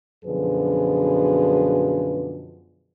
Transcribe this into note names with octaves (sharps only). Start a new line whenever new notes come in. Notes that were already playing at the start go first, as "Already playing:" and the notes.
F#2 B2 D3 F3 G#4 B4